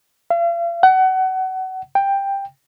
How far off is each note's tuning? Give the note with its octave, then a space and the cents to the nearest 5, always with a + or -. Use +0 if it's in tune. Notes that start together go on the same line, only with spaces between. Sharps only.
F5 -40
F#5 +30
G5 +10